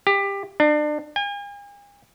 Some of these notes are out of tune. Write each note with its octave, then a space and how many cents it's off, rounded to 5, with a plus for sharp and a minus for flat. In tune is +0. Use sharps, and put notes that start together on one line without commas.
G4 +20
D4 +30
G#5 -45